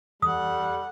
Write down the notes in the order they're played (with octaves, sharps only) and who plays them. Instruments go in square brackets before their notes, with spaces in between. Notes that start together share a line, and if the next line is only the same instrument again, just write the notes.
[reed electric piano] E2 [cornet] G3 [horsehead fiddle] A4 F#5 [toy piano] D#6